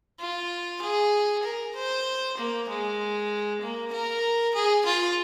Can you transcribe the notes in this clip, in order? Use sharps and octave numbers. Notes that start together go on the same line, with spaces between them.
F4
G#4
A#4
C5
A#3
G#3
A#3
A#4
G#4
F4